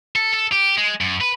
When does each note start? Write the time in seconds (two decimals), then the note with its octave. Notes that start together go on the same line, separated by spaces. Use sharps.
0.16 A4
0.34 A4
0.52 G4
0.77 G#3
1.01 F#2
1.21 B4